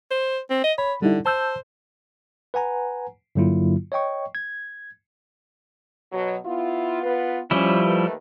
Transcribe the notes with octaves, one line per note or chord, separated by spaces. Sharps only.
C5
C4
D#5
C#5 B5
D3 G3 D#4 E4
C5 A5 E6 G6
B4 F#5 G#5 A#5
G2 D3 F#3 A#3 E4 F4
C#5 D#5 G5 C#6
G#6
B2 F#3
B3 E4 F4
B3 F4 B4
F3 G3 C#4 E4
D#2 A3 B4